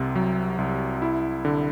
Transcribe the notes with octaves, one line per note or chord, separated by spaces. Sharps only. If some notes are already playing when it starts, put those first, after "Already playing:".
Already playing: C2 C3
F#3
C2
E4
D3